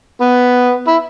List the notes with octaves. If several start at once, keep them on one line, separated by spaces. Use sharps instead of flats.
B3
E4